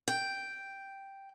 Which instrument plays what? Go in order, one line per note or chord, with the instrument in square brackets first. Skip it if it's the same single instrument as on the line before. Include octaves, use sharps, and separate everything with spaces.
[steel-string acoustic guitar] G5